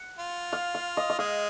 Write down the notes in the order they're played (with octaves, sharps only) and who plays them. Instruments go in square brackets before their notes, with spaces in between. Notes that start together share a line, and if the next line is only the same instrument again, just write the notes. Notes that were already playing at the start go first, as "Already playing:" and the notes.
Already playing: [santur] F#5
[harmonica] F4
[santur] F5
F5
D#5
D#5
[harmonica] G#3 [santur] F5